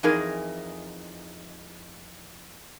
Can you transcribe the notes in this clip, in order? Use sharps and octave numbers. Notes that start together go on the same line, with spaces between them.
F2 E3 D#4 G#4 A#4